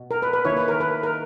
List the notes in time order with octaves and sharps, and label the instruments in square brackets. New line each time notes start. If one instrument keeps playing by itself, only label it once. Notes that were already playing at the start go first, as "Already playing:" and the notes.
Already playing: [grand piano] B2
[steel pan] A#4
B4
B4
[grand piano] D#3 A#3 E4 [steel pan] C#5
[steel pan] B4
A#4
B4
A#4